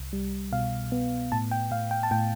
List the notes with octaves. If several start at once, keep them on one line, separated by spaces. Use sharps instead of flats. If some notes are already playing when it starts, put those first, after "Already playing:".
Already playing: C2
G3
B2 F5
B3
A2 A5
G5
A2 F5
G5
A5
A2 G5